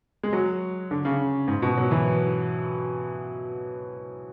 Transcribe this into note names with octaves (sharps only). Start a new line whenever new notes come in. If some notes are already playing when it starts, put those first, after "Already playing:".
G#3
F#3
D3
C#3
G#2
B2
F#3
E3